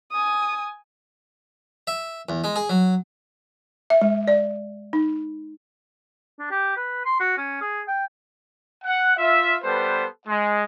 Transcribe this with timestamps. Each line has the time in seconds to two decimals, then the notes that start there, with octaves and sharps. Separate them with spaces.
0.12 G#5 D#6
1.87 E5
2.29 E2
2.44 G#3
2.56 G#4
2.69 F#3
3.90 E5
4.02 G#3
4.28 D5
4.93 D#4
6.39 D4
6.51 G4
6.77 B4
7.05 C6
7.20 F#4
7.37 C#4
7.61 G#4
7.88 G5
8.85 F#5
9.17 F4 E5
9.63 G3 B3 A4 B4 C5
10.28 G#3